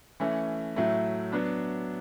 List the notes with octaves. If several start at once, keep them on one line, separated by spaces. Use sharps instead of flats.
E3 A3 C#4
A2 F#3 A3 E4
F#3 B3 D4